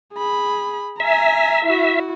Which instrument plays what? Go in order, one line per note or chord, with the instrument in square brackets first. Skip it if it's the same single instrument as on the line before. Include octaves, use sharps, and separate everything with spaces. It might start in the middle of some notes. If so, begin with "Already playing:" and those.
[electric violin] G#4 B5
[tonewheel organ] E5 [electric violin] G#5 A#5
[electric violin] E4 F#4